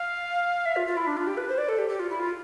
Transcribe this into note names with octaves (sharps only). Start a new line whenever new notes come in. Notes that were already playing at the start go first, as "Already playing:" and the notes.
Already playing: F5
E5
F4
F4
E4
D4
F4
G4
B4
C5
D5
A4
G4
G4
F4
E4
F4